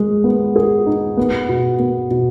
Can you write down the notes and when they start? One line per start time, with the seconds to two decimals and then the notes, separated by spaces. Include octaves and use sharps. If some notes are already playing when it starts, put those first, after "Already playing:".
Already playing: G#3 G#4
0.24 B3
0.56 G#4
0.87 D#4
1.17 B3
1.49 B2
1.79 B3
2.11 B2